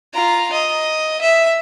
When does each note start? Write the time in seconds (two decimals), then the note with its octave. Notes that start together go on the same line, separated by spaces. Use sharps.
0.14 F4 A#5
0.53 D#5
1.21 E5